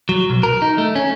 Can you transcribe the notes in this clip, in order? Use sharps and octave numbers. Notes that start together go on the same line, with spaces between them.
F#3
B1
A#4
D#4
A3
C#4